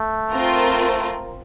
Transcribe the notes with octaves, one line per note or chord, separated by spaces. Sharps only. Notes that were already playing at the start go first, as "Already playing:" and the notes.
Already playing: A3
C4 F4 A#4